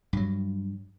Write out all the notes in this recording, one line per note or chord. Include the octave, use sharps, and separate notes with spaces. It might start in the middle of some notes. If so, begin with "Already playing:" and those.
G2 F#3